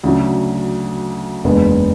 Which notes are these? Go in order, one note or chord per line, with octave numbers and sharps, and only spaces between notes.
D2 C#3 F#3
F#1 E2 D3 G#3 B3